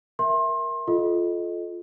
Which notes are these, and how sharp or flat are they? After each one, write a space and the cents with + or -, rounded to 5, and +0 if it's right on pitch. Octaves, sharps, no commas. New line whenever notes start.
A#4 +10 E5 +0 C6 +30
F4 +0 A4 -30 D#5 +0